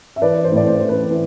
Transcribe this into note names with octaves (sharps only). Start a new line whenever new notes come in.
E5
E3 B4 D5
C5
A2 D5
C5
E3 C5
B4
E3